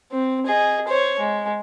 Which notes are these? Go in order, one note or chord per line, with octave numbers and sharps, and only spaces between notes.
C4
G#4 D#5
C5 C#5
G#3